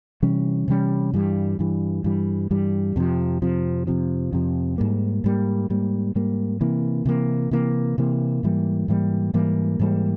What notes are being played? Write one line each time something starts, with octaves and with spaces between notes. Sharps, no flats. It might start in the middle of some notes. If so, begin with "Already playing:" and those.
C3 E3 G3 C#4
C3 E3 G3 C#4
G2 E3 G3
G2 E3 G3
G2 E3 G3
G2 E3 G3
F2 C3 F3
F2 C3 F3
F2 C3 F3
F2 C3 F3
G#2 G3 A#3
G#2 G3 A#3
G#2 G3 A#3
G#2 G3 A#3
C3 E3 A#3
C3 E3 A#3
C3 E3 A#3
C3 E3 A#3
G#2 E3 G3 A#3
G#2 E3 G3 A#3
G#2 E3 G3 A#3
G#2 E3 G3 A#3